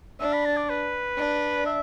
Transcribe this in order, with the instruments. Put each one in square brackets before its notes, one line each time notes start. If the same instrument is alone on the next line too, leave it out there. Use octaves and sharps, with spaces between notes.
[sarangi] D4 [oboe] E5
[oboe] B5
A5
D5
B4
[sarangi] D4
[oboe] E5